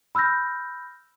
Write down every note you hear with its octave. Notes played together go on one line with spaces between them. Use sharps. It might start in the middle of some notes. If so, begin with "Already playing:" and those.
B5 E6 F6 G6 A#6